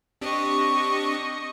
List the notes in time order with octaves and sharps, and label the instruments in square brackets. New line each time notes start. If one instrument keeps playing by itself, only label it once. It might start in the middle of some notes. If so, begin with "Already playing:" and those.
[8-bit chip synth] C4 D4 G4 [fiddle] D#5 C#6